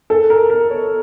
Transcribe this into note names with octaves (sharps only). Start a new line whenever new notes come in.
A4
A#4
A#4
C#5